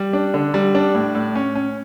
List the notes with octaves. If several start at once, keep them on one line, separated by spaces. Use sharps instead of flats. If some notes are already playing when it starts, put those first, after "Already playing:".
Already playing: G3
D4
D3
G3
D4
A2
A2
C#4
C#4